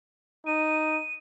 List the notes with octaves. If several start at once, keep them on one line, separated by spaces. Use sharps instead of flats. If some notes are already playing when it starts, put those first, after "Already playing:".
D#4 D#7